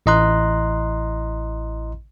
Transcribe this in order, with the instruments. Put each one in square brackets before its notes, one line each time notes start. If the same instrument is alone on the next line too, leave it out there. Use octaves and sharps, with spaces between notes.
[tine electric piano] A1 E4 D#5 A#5 C6 F#6